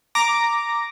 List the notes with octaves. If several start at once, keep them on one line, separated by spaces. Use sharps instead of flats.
A#5 D6 A#6